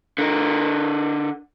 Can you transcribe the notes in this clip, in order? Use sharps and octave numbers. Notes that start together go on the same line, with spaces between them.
D3 A#4